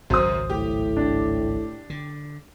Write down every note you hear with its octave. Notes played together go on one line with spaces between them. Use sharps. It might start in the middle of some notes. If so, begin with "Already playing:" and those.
G#1 C#2 F#2 F#3 C5 D#6
A2 G4
D4
D3